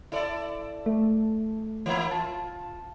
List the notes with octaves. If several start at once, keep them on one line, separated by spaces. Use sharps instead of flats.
E4 A4 D5
A3
E3 A#3 E4
F4 A5